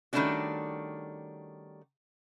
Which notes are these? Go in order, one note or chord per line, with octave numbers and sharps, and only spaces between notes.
D#3 G3 A3 C#4 D4 F#4